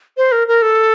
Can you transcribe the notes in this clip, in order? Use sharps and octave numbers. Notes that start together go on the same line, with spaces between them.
C5
A#4
A#4
A4